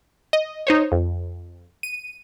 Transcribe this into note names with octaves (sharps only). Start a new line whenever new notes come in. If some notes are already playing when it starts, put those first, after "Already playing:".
D#5
D#4 C5 C#5
F2
D#7